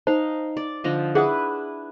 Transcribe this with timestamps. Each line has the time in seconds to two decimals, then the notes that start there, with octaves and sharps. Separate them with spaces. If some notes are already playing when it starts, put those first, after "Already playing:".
0.07 D#4 C5 F5 A5
0.57 D5
0.84 D3 F3 D#5
1.15 D4 E4 G#4 B4 F#5 D#6